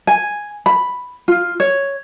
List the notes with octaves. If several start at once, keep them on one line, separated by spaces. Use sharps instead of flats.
G#5
B5
F4
C#5